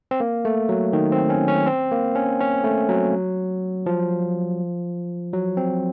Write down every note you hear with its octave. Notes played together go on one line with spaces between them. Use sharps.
C4
A#3
A3
F#3
D#3
C4
C#4
C#4
C4
A#3
C#4
C#4
A3
F#3
F3
F#3
C4